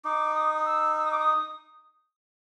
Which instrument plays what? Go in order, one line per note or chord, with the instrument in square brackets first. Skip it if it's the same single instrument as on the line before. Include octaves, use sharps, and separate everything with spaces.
[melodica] D#4 [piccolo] D6
[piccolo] D#6
D#6
E6
E6
D#6
D6
D#6